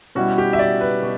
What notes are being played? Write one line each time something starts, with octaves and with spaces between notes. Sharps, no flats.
B2 G3 C#4 E4 F#4
G4
E5
D5
B4
B2